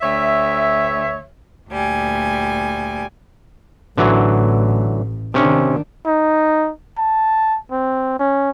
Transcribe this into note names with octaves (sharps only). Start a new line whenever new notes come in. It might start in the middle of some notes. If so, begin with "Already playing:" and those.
D2 C#5 E5
D2 A#2 G3 G#5
A1 A2 D3 E3 F#3
C3 D#3 C#4 D4
D#4
A5
C4
C#4